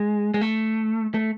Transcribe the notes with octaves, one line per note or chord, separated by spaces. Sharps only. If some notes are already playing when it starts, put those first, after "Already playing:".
Already playing: G#3
G#3
A3
A3